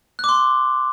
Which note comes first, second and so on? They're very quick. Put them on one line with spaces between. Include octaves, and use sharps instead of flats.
F#6 D6 C6